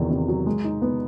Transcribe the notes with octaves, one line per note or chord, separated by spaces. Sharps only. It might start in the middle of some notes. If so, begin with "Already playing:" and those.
Already playing: E2 C3 D#3 F#3
C3
F#3
G#3
D#4
B3